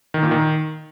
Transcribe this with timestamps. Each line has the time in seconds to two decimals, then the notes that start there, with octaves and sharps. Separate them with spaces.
0.14 D#3
0.23 A#2
0.31 D#3